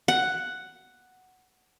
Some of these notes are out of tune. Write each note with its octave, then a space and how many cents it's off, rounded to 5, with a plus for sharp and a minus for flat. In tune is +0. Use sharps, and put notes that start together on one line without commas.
F#5 +5